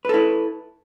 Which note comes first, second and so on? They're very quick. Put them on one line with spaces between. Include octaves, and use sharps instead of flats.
B4 A4 E4